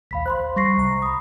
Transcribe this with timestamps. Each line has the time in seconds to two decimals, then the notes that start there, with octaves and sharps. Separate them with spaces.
0.11 A#1 D#2 F5 B5 B6
0.26 C5 B5 C6 F#6
0.56 G3 C#6 A#6 C7
0.78 C2 A#5
1.02 B5 D#6